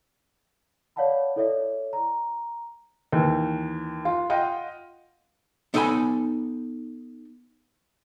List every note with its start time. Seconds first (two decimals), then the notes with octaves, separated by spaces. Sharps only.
0.96 C#5 D5 F5 F#5 A5 B5
1.36 E4 A4 C#5 D5 E5
1.93 A#5
3.12 D#2 E3
4.05 F4
4.30 F4 D#5 F#5 G5
5.74 B3 D#4 A4 G5 G#5 B5